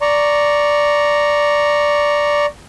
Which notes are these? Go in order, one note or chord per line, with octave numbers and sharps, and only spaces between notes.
D5 A#5 C#6